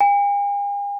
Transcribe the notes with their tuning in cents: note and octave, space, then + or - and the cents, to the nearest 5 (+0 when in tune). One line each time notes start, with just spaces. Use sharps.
G#5 -45